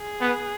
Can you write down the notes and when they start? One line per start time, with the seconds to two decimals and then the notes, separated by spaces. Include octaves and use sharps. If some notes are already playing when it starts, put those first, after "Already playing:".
Already playing: G#4
0.21 B3